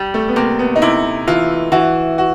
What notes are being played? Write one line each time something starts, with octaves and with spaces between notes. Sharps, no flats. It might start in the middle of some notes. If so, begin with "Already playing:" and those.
Already playing: G3
A3
B3
C3 A#3
B3
D#4
C3 E4
E3 F4
E3 F#4
F#4